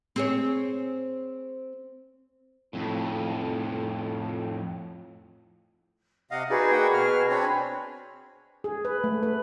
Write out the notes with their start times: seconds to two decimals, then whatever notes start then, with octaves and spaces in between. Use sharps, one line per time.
0.16 C4 G#4 C#5
2.73 F2 A2
6.31 C3 D#5 F5 F#5
6.50 D#4 F#4 G#4 B4 D5
6.71 A#3 F#5 G5
6.94 B2 F6
7.29 C4 D4 C#5 G#5 B5
8.64 G#4
8.85 B4
9.04 A3
9.23 B4